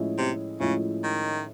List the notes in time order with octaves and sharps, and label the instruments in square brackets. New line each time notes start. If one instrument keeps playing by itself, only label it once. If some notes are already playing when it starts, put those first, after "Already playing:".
Already playing: [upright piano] A2 F3 G#3 C#4 E4
[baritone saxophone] C3
[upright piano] A2 F3 G#3 C#4 E4 [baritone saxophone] C#3
[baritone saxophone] D#3